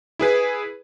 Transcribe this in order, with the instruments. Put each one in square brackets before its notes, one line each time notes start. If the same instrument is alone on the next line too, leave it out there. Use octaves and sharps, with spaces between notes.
[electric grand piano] E4 G#4 B4